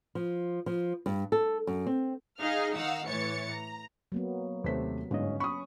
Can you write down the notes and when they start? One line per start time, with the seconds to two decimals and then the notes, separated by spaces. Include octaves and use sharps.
0.15 F3
0.66 F3
1.06 G2
1.32 A4
1.67 F#2
1.87 C4
2.39 D#4 G#4 D#5 F5 F6
2.74 D#3 D#4 F5 F#5 E6
3.07 A2 E3 C#5 A6 C#7
3.51 A#5
4.12 F#3 A#3 B3
4.64 D#2 C3 A3 C5 B6
5.11 G1 G#2 C#4 D#5
5.40 B5 C#6 D#6